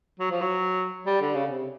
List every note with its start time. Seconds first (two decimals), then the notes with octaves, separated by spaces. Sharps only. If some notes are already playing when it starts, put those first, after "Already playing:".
0.20 F#3
0.31 F3
0.41 F#3
1.06 G3
1.21 D3
1.35 C#3
1.50 C3